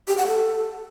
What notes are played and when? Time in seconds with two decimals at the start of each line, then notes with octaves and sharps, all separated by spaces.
0.08 G4
0.18 F#5
0.27 A4